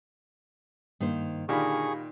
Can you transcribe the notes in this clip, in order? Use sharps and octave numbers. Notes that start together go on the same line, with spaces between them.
G2 D#3 A#3 C5
A#2 D3 D#3 G4 G#4 F5 B5 C#6